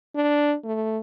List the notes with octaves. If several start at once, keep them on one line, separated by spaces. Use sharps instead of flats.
D4
A3